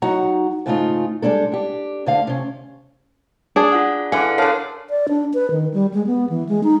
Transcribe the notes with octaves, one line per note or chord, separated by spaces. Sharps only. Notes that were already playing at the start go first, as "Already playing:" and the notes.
F#3 D#4 F#4 F#5 A#5
G#2 C#3 A3 D#4 F4
G3 G#3 C#4 D4 A4
D4 G4
D2 D3 F5
C3 C#4
D4 G#4
F4 F#5
D3 E3 F5 F#5 G#5
D3 A#4 C#5 F5 A5
D5
D4
B4
D#3
G3
G#3
B3
E3
G#3
D#4